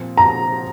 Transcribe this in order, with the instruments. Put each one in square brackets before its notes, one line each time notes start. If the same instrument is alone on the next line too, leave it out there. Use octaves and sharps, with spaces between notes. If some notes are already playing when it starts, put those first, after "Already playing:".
Already playing: [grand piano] A#2 F3 C4
[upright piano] A#5